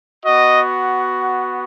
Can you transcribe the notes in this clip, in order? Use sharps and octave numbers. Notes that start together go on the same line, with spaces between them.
B3 F#4 D#5